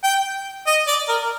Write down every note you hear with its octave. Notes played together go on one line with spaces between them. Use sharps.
G5
D#5
D5
A#4